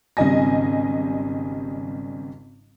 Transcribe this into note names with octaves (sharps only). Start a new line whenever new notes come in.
G#1 C#3 G3 D#5 G#5 A#6